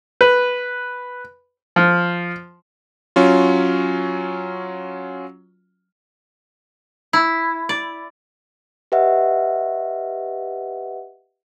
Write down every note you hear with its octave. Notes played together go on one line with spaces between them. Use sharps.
B4
F3
F#3 C#4 F4
E4
D5
G4 B4 D#5 E5 F#5